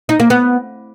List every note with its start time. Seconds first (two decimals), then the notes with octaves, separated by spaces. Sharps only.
0.09 D#4
0.20 A#3
0.30 B3